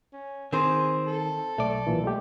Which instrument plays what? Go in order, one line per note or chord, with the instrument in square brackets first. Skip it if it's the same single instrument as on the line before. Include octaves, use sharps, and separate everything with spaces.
[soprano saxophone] C#4
[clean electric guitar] D#3 [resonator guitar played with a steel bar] C4 C5 [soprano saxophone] G#4
[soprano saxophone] A4
[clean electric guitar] B1 D5 [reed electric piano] A3
[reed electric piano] A#2 E3
G#3 A3 G4